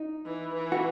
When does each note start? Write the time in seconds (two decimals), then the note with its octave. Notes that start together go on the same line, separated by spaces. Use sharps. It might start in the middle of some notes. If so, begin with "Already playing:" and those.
Already playing: D#4
0.26 E3
0.54 E3
0.72 F#4